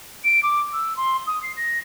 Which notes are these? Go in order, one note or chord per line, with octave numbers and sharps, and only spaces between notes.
D7
D6
E6
C6
D#6
C7
A#6